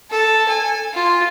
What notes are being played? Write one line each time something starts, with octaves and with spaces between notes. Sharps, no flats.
A4
G#5
F4